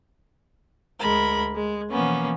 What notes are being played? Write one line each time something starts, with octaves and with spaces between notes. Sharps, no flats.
D2 G#3 A#4 B5
G#3
B2 E3 F3 A#3 B3 C#4